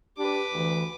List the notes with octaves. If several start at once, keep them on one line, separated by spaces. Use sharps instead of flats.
D4 G4 B4 D6
D2 E3